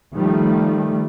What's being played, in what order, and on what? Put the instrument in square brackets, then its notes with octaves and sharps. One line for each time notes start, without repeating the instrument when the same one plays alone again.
[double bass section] D#3 F3 G3 A3